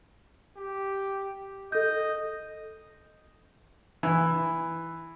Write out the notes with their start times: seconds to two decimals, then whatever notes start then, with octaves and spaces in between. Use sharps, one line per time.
0.57 G4
1.72 A4 D#5 G6
4.03 E3